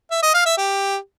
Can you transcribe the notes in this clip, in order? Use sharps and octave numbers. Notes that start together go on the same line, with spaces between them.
E5
D#5
F5
E5
G4